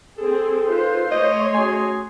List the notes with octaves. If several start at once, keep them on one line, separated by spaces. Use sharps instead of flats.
C4 G#4 A4
D#4 F4 B4 C5
A3 C#5 D#5 C6
C#4 F#4 G#4 G#5